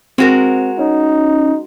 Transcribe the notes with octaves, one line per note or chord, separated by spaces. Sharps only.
G#3 C4 F#4 A#4
C#4 D#4